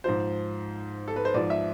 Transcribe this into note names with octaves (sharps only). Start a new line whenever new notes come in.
G#2 F3 C5
A4
B4
C5
G#2 F3 D5
E5